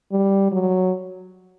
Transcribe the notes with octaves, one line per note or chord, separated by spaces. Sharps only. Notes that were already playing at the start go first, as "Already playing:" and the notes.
G3
F#3